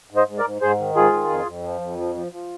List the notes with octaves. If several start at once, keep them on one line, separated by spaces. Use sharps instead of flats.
G#2
C5 D#5
G#2
A#4 D5
G#2
G#2 G#4 C5
D#3
G#2 F4 G#4
D#3
F2
F2
F3
F2
F3
F3
F3